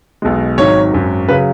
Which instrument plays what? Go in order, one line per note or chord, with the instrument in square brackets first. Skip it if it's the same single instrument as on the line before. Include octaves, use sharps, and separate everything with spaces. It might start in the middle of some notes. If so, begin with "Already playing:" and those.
[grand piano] B1 B2 G#3
G#1 G#2 D#3 F#3 C#5
G#1 F#2 F#3
C#3 F#3 B4